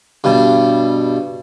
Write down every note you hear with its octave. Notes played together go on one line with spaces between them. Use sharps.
G2 B2